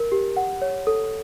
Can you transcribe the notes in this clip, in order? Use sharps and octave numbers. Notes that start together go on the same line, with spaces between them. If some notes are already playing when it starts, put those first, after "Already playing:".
Already playing: A#4
G4
F#5
C#5
A4